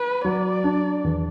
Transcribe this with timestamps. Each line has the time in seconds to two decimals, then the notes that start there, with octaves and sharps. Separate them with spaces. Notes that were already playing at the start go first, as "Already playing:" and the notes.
Already playing: B4
0.25 F#3 D5
0.64 D4
1.04 E2